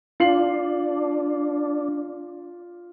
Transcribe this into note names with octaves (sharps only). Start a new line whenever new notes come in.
D4 F4 C7 F#7